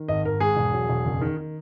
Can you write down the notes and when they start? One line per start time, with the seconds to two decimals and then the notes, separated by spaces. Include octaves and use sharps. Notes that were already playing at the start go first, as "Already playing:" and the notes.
Already playing: D#3
0.08 G#1 D#5
0.25 G#1 A#4
0.40 G#2 G#4
0.57 E1
0.73 F#3
0.89 E1
1.05 F#1
1.22 D#3
1.37 D#3